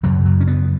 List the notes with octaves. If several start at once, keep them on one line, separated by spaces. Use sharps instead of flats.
F#2 C#3 F#3
F#3
C#4
B3